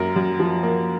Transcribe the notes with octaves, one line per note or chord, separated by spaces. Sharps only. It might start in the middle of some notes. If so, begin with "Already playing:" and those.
Already playing: F#2 A#3 A#4
F#2
F3
A#3